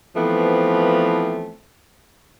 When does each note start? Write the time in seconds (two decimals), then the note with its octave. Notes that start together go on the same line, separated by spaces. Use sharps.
0.16 E3 F3 A3 B3 C4